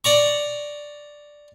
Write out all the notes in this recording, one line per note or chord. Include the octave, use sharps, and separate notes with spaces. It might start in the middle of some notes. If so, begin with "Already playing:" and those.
D5 A#5 C#6